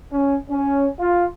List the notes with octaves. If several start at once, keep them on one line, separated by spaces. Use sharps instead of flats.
C#4
C#4
F4